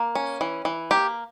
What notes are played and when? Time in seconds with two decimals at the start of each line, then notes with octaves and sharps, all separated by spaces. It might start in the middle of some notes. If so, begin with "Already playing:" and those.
Already playing: A#3
0.15 C#4
0.41 E3
0.65 E3
0.91 A#3 G4